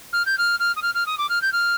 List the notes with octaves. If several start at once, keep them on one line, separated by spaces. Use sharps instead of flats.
F6
G6
F6
F6
D#6
F6
F6
D#6
D6
F6
G6
F6